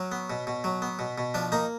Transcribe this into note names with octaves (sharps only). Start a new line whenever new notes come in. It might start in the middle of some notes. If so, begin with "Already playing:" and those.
Already playing: F#3 C#4
B3
B2
B2
F#3
B3
B2
B2
F3 D4
A#3 D#4